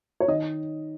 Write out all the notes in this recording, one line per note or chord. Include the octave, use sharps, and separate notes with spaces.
C#5
D#3 D#5